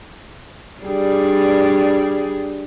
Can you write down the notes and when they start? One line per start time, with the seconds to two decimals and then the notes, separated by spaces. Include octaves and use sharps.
0.83 G3 D4 G#4